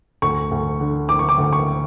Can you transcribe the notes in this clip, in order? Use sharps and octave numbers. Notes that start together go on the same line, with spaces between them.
D2 C#6
D2
D3
D3 D6
C#6
D6
D2
C#6